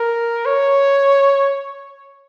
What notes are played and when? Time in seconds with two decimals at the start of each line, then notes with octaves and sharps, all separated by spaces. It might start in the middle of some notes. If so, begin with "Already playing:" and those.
Already playing: A#4
0.46 C#5